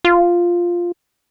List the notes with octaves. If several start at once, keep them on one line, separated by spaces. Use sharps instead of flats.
F4